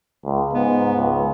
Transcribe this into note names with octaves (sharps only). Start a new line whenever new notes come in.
C#2
G#2 B3
C#2